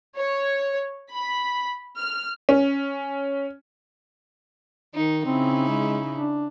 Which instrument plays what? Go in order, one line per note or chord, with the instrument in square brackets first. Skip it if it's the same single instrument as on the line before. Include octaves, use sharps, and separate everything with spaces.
[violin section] C#5
B5
F6
[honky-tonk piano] C#4
[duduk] D#3 [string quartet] D#4
[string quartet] C#3 D#4 E4 [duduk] C4
[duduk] G#3
D4